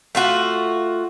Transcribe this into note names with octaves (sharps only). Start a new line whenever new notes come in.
A3 F4 F#4